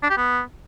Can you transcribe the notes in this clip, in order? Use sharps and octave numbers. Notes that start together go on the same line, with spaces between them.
D4
G4
B3